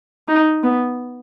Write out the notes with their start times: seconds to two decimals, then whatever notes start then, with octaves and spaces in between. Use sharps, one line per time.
0.28 D#4
0.63 B3